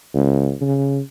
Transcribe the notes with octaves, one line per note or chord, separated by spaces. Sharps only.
C#2
C#3